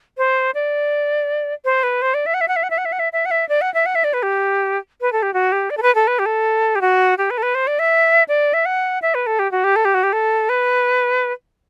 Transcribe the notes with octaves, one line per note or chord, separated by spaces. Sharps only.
C5
D5
C5
B4
C5
D5
E5
F#5
E5
F#5
E5
F#5
E5
F#5
E5
F#5
E5
E5
F#5
E5
D5
F#5
E5
F#5
E5
D5
B4
G4
B4
A4
G4
F#4
G4
D5
A4
B4
A4
B4
G4
A4
G4
F#4
G4
B4
A4
B4
C5
D5
E5
D5
E5
F#5
E5
B4
A4
G4
F#4
G4
A4
G4
F#4
G4
A4
B4